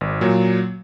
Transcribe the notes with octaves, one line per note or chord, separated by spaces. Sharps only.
G#1
A#2 F#3